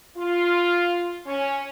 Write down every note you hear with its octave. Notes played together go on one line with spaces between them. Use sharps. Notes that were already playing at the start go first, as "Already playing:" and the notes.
F4
C#4